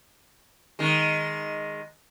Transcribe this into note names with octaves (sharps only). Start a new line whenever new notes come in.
D#3 G#3